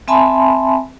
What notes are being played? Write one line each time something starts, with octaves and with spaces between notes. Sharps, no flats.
C4 E5 G#5 A5 B5 C6